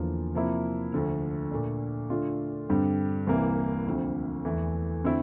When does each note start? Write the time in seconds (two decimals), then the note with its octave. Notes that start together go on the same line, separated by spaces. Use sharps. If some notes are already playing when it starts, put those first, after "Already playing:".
Already playing: E2 D3 F3 A#3 F4
0.34 C3 F3 A#3 E4
0.93 D2 D3 F3
1.51 A#2 A3 D4
2.10 D3 A3 D4 F4
2.69 G2 D3 G3 C4
3.27 C2 C3 E3 A#3
3.87 D2 D3 F3 C4
4.45 E2 E3 A3
5.04 D3 A3 C4 E4